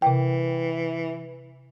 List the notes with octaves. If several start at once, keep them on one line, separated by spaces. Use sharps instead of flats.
C3 E3 G5